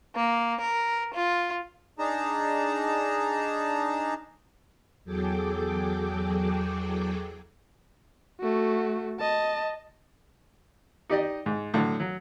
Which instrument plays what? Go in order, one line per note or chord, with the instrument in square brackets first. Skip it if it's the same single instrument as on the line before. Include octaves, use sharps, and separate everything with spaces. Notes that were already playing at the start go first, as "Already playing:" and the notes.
[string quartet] A#3
A#4
F4
[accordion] D4 D#4 G#4 A5 A#5
[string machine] E2 F#3 G#4 A4 G5 D6
[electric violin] A3 F#4
D#5 A5
[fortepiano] D#4 G4 D5 D#5
G#2
A2 D3 F#3
F#3